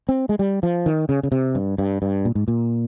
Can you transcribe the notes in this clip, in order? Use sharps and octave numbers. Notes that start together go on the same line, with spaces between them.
C4
G#3
G3
F3
D#3
C#3
C#3
C3
G2
G2
G2
A#2
G#2
A#2